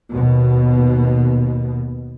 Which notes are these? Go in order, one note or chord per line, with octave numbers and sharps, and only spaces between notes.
D#2 B2